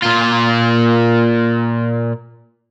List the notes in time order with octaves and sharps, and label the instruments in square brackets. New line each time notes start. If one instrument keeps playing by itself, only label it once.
[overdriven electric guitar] A#2 F4